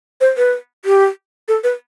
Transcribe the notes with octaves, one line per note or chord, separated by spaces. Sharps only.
C5
B4
G4
A4
B4